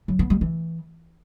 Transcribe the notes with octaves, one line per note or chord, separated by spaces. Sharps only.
F#3
B3
G3
E3